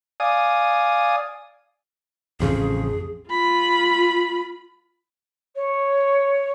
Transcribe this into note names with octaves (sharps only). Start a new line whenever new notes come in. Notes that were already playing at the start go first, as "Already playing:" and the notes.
D5 F5 G#5 D#6
A1 F2 C#3 G#4
F4 B5
C#5